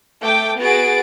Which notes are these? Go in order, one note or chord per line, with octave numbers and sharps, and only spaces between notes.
A3 G5 D6
B3 F#4 G#4 A6 D7